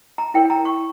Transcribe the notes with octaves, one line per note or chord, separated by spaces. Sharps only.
A#5
E4 A#4 C#5 G5
G5
A#5
C#6